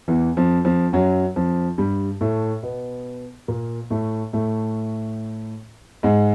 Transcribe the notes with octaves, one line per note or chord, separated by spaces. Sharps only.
E2 E3
F2 F3
F2 F3
F#2 F#3
F2 F3
G2 G3
A2 A3
B2 B3
A#2 A#3
A2 A3
A2 A3
G#2 G#3